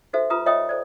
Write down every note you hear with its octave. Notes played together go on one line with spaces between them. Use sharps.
D#4 F#4 A4 C5 E5
F4 G4 B4 A#5 D#6
F4 C#5 D#5 E5 G5 D#6
A4 C5 D5